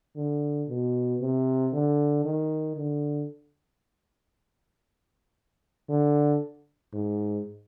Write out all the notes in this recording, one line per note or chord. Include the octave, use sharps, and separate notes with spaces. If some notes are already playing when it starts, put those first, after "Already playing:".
D3
B2
C3
D3
D#3
D3
D3
G#2